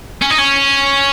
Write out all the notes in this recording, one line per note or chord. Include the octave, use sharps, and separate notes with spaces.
C#4
D#4
C#4